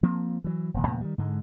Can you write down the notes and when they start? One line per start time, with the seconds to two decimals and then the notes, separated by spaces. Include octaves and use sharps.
0.03 F3 A#3 C4
0.44 E3 F#3
0.74 E1 A#2 D#3
0.87 E2 A#2 C#3 A3
1.01 D#3 E3 G3
1.18 G#2 D3 G#3